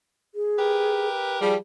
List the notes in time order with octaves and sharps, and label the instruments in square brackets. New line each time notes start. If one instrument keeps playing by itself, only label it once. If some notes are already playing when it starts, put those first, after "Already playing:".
[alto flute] G#4
[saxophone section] G4 A#4 B4
[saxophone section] F3 G3 [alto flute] G#4